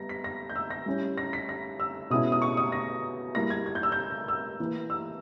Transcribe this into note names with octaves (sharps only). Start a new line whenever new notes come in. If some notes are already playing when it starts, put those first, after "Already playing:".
Already playing: G3 B3 A#6
B6
A#6
G6
E6
A#6
G3 C#4 E4
A#6
B6
A#6
E6
B2 G#3 C#4 E4 D#6
D#6
C#6
D#6
A#6
G3 A#3 E4 A#6
G#6
G#6
G6
E6
G6
E6
E3 A#3 E4
E6